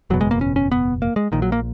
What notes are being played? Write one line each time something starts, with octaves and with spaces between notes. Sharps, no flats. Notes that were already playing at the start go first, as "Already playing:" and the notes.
F#1 E2 B2 F#3
G#3
A#3
C#4
C#4
B3
A#3
G#3
A#1 A#2 D#3
F#3
A#3